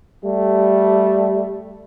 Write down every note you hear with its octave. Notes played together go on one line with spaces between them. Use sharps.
G3 A3